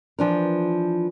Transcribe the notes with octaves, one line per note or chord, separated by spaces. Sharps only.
E3 F3 D4 A#4